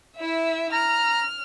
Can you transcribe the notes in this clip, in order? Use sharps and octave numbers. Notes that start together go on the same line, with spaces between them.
E4 E5
A#5 F6